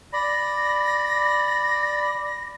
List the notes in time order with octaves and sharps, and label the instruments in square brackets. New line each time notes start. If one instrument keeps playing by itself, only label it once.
[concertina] D5 B5 [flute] A#6